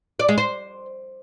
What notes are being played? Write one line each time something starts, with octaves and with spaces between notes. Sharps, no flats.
D5
G#3
C5